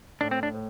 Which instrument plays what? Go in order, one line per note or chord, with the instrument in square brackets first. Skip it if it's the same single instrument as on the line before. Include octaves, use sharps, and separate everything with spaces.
[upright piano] A2 [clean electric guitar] D4
[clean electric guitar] C4
D4
[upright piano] A2